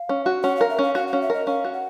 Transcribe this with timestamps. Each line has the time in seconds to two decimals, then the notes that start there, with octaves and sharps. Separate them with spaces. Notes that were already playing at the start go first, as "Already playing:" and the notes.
Already playing: F5
0.09 C#4
0.26 F#4
0.43 C#4 F#5
0.57 A#4 F5
0.70 E5
0.79 C#4 F5
0.95 F#4 F5
1.08 F5
1.13 C#4
1.22 E5
1.30 A#4 D#5
1.47 C#4 F5
1.64 F#4
1.73 F#5